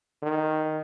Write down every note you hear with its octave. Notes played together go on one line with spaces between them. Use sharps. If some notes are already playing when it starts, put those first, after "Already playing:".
D#3